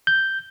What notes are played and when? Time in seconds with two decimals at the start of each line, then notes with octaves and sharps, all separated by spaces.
0.07 G6